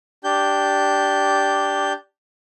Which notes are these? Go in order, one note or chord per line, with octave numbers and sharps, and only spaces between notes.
D4 G4 G6